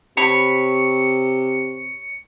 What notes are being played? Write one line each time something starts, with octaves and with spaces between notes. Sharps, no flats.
C3 C#5 B5 C#7